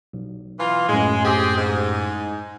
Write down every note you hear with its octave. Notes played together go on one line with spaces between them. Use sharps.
B1
E3 F4
F#2 A2 G#3
C4 G4 G#4
G#2